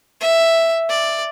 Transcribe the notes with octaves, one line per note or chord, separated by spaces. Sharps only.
E5
D5